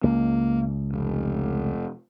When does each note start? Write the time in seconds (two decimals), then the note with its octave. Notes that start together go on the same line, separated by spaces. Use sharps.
0.04 C#2 A#3
0.93 F1